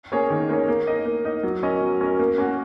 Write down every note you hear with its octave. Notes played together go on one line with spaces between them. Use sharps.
A#3 C#4 G#4 C#5
D#3
A#3 C#4 G#4 C#5
A#3
D#4 A#4 D#5
A#3
D#4 A#4 D#5
F#3
C#4 A#4 D#5
F#3
C#4 A#4 D#5
A#3
C#4 F#4